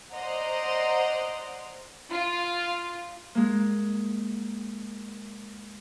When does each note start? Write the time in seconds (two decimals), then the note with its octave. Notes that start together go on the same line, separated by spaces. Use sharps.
0.13 C5 D5 D#5 F#5 A#5 C6
2.11 F4
3.35 G#3 A#3